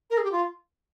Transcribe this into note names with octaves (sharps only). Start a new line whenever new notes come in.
A#4
G#4
G4
F4